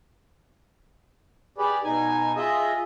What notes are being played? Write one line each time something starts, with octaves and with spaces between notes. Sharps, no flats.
G4 G#4 B4 D5
B2 D#4 G#5
F4 G#4 D#5 E5